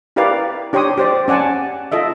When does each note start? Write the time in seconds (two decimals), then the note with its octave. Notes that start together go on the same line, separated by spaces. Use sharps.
0.16 E4 G4 A#4 B4 D5 F5
0.73 D4 G4 C#5 G5 C6 D#6
0.98 G4 C5 D5
1.28 C#4 D5 F#5 G#5 A5
1.92 F4 A4 D#5 E5